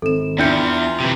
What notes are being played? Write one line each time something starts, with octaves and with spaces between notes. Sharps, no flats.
G#1 A4 E7
E2 D4 D#4 F4 E5 G5 G6 C#7
C3 E3